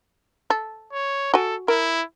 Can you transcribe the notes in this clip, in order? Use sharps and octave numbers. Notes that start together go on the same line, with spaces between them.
A4
C#5
F#4 A4 G#5
E4 A#4